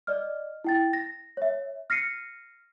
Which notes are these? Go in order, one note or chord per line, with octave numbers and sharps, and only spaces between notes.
D5 D#5 F6
E4 G5 A6
A#6
C#5 E5
F6 A#6 C7 C#7 D#7